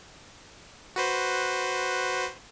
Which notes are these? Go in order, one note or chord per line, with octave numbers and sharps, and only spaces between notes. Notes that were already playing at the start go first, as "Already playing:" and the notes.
F#4 B4 C5